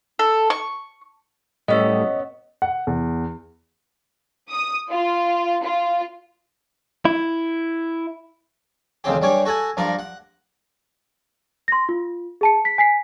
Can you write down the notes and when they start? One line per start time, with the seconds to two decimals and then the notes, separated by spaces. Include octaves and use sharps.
0.19 A4
0.50 C#6
1.68 A2 G3 B3 C#4 D#5 E5
2.62 F#5
2.87 E2
4.50 D#6
4.90 F4
5.63 F4
7.05 E4
9.04 A1 D#2 C#3 C4 G4
9.22 G2 G3 C#5 G#5 D6
9.45 F#4 A4 F#5 G#5
9.77 G2 F3 A#4 D5 A#5
9.99 F#5
11.68 C6 A#6
11.89 F4
12.41 G#4 A5 C#7
12.65 B6
12.78 G#5 B6 C7